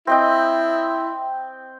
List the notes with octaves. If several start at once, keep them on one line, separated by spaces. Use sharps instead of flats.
C4 E4 D#5 G5